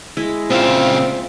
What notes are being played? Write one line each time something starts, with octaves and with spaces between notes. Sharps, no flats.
G#3 E4
A#2 C#3 C4 F4 E5 F5